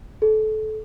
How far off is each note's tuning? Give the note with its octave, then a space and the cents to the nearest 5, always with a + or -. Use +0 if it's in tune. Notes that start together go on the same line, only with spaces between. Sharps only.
A4 -25